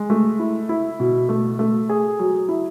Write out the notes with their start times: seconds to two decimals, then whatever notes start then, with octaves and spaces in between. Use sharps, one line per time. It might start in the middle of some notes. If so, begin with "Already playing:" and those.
Already playing: G#3
0.10 A3
0.39 E4
0.69 E4
1.00 B2
1.29 A3
1.59 A3
1.89 G#4
2.19 F#3
2.49 E4